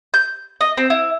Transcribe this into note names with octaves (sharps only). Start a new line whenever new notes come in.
G6
D#5
C4
E4